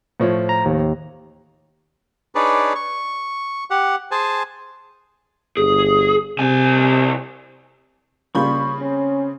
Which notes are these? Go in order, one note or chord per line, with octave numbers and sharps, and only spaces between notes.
A2 F3 C#5
A#5
D#2
D4 D#4 G#4 B4 C#5 D5
C#6
G4 F#5
G#4 C5 G#5 A5
G1 G#4
C2 C3 G#5
C#3 G3 A#3 F4 B5 C#6 G6
C4 C#4